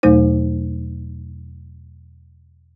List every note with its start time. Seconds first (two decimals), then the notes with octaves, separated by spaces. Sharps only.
0.03 E2 B2 F#3 A3 D#4 C5